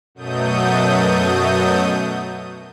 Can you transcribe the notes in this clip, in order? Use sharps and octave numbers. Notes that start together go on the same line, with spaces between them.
F#2 B2 F#3 A3 D#6 G6